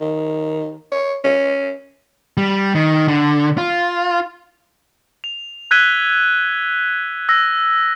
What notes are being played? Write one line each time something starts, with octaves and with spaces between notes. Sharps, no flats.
D#3
C#5
C#4
G3
D#3
D3
F4
F7
E6 F#6 G#6 B6 D#7 G7
E6 A#6